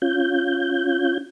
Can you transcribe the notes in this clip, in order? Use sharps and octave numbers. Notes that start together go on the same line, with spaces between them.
C#4 F4 G6